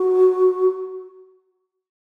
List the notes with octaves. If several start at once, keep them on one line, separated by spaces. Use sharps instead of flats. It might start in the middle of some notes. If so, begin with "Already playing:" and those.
Already playing: F#4